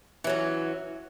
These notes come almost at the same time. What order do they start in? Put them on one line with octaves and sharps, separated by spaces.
E3 F#3 C#4